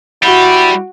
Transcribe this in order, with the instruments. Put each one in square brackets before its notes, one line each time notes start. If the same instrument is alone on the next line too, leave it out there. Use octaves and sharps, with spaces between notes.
[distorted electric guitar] G3 G4 [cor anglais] E4 [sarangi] F#4